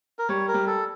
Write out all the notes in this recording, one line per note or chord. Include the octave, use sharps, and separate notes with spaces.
A#4
G3 C#5
A#4
G3
A4